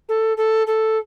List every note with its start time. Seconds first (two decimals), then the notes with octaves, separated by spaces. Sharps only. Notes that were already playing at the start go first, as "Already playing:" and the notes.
0.08 A4
0.37 A4
0.67 A4